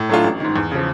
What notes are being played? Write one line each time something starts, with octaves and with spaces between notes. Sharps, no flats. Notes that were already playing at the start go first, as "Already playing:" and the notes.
Already playing: A2
F#3 A3 D4 F4
A1
G#2 D#3
E2
C#3 F3